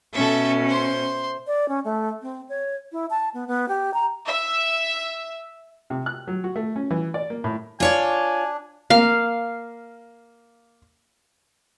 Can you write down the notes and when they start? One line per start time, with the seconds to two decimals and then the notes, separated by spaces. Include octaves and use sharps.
0.13 B2 C#4 A4 E5
0.68 C5 C6
1.47 D5
1.69 C#4
1.84 A3
2.22 C4
2.49 C#5
2.92 E4
3.10 A5
3.34 B3
3.48 B3
3.68 G4
3.94 A#5
4.28 E5
5.90 C3
6.06 F#6
6.28 F#3
6.44 F#4
6.56 A3
6.76 C#4
6.91 E3
7.14 D5
7.30 A#3
7.44 A2
7.80 D4 F4 C#5 D5 G#5
8.90 A#3 F5